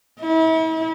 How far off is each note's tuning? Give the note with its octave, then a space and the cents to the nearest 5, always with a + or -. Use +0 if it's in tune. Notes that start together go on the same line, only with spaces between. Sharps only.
E4 -40